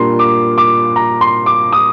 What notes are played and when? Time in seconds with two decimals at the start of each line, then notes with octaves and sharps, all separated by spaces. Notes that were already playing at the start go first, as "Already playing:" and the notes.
Already playing: A#2 G3 A#3 D4 F4 C6
0.19 D6
0.58 D6
0.96 A#5
1.21 C6
1.46 D6
1.72 D#6